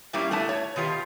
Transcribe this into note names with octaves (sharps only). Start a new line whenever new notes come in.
A#2 G3 A#3 C#4 E4 G4
A3 B3 E4 A5
C#5
B2 D#3 F4 G4